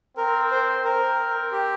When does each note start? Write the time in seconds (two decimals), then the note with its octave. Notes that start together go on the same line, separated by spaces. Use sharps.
0.17 C4 A#4
0.51 C5
0.84 C4 A#4
1.52 G4